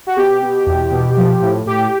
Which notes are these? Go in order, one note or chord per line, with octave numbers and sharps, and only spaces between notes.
F#4
B2 G4
B2
E2
B2
F3
A2
A2 G4